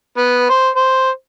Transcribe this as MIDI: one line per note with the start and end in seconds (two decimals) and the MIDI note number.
0.17 0.48 59
0.50 0.68 72
0.76 1.10 72